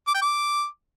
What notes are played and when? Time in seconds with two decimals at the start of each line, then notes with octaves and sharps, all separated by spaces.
0.07 D6
0.14 G5
0.21 D6